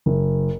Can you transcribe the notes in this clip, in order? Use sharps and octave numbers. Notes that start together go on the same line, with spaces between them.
F#1